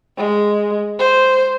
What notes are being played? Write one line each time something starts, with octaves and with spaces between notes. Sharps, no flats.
G#3
C5